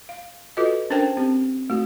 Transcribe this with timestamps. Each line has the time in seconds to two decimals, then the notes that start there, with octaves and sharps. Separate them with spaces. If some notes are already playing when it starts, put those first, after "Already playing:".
0.09 F5
0.57 F4 F#4 A4 B4 D#5
0.90 C#4 D4 A#4 C5 G5 A5
1.17 C4 G4
1.70 A3 F#4